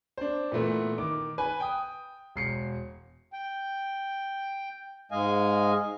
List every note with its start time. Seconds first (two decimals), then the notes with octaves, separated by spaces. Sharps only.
0.17 D4 C5
0.52 A#2 E3 A3 B3
0.98 D#3 D6
1.38 B4 G#5
1.60 G5 D#6
2.36 E1 C7 C#7
3.33 G5
5.11 G#2 G#3 D#5 F5 G#5